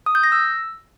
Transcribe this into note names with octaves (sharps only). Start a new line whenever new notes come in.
D#6
G6
A#6
E6